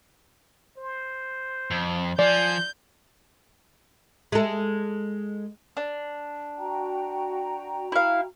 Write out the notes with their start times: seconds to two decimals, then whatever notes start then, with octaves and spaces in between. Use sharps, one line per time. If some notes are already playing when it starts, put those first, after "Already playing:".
0.78 C5
1.71 F2
2.19 F3 D5 G#5 G6
4.32 G#3 A4
5.77 D4
6.58 F#4 G5 A#5
7.92 E4 F5